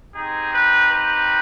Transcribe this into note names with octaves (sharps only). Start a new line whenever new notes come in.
C4 D#4 G4 G#4
B4
B4